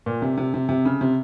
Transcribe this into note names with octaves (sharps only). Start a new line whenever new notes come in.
A#2
C3
C3
C3
C3
C#3
C3